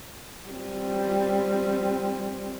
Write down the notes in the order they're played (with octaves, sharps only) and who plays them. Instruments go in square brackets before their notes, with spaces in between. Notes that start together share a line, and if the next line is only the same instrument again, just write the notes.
[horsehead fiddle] G3 C4